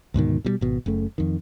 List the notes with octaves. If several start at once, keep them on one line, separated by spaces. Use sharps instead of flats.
D2 G#2 B2 D#3
B2 F3 G3
G#1 B2
F#1 C#3 A3
F2 D#3